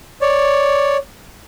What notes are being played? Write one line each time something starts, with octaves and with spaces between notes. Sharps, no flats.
C#5 D5